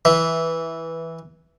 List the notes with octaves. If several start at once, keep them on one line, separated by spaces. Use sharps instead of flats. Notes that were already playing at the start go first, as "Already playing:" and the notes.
E3